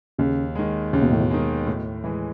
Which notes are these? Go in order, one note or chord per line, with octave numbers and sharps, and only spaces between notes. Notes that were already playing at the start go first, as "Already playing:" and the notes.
D#2 C#3
D#3 G#3
D#2 C#3
B2
A2
B2
D#3 G#3
A2
E3 G#3